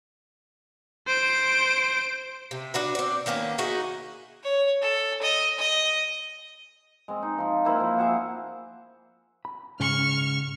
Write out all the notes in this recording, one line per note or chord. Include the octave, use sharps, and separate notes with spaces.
C5 D7
C3
D4 F#4 B4
C4 D5
D#3 A#3 B3 C#4
D#4 E4 F#4 G#4
C#5
A4
D#5
D#5
G#3 C4
D#4
F3 F4
A#3 E4 C5
F3
G#4 E5 F#5 G5
B5
G#2 C#3 C#6 F6